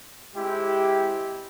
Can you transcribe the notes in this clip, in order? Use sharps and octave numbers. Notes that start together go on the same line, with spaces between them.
G#3 C4 E4 G4